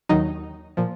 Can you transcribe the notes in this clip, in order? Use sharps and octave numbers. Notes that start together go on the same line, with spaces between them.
D#2 D#3 F#3 D#4
A#2 F3